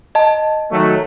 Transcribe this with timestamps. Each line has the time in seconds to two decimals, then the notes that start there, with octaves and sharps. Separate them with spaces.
0.15 D#5 A5
0.72 D#3 F#3 A3